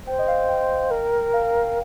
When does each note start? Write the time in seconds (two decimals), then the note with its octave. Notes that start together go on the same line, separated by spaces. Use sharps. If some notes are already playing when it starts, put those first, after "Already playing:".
0.07 C5 G5
0.19 D#5
0.28 F5
0.49 G5
0.91 A#4
1.33 F5